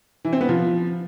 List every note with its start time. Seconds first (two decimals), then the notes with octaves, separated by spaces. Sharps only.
0.25 E3
0.33 C4
0.41 B3
0.49 F3